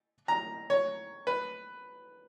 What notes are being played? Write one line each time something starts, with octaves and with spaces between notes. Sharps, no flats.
A#5
C#5
B4